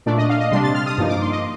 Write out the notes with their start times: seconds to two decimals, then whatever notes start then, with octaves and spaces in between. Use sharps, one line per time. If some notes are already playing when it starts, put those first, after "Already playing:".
0.06 A#2 A3 D4 D5
0.18 D#5
0.30 F5
0.40 D#5
0.52 C3 G3 D4 C6
0.63 A6
0.75 F6
0.86 D#6
0.98 G2 F3 A#3 D#4
1.09 D6
1.22 C6
1.32 D#5